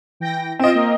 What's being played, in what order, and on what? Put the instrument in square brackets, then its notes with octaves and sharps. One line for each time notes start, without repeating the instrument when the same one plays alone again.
[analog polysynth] E3 G5 A#6
[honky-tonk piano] C4 D#5 [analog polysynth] F4 D7 E7
[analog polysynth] A#3 A#4